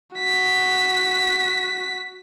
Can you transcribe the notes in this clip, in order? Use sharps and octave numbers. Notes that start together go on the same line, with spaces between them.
F#4 B6